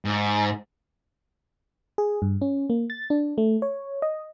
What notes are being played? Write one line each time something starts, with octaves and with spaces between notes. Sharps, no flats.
G#2
G#4
G2
C#4
A#3
A6
D4
A3
C#5
D#5